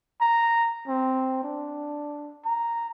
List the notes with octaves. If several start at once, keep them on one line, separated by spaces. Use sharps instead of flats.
A#5
C4
D4
A#5